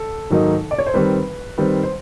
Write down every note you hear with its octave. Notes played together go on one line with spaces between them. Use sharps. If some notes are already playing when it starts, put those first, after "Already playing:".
Already playing: A4
G#2 D#3 F#3 A#3 D#4
D5
C#5
C5
D#3 G3 C4 B4
D#3 G3 C4 B4
C5